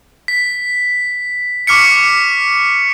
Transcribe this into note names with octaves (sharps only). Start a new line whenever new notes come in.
B6
C#6 D6 F6 B6 C#7